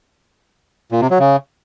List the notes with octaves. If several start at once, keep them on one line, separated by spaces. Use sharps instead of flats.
A#2
C3
F#3
C#3